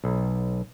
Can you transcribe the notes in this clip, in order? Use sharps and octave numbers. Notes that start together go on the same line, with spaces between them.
B1